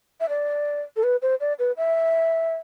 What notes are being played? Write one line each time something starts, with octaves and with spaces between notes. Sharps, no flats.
E5
D5
A4
B4
C5
D5
B4
E5